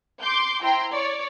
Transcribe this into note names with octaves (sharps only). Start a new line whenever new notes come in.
C6 D6 G6
E4 C5 G5 A#5 C6
C#5 D5